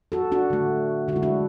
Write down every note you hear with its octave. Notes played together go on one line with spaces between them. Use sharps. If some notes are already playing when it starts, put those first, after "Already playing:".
F#4 A4
D4 F#4
D3 A3
D3 G#3 E4 F#4
D4 F#4